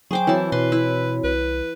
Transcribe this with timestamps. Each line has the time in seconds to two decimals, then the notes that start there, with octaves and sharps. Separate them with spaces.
0.11 F#3 G#4 C5 G5 G#5 C#6 D6
0.27 E3 C4 E4 F#4 C#5 A5
0.52 B2 B4 C6
0.72 E4
1.24 C2 B4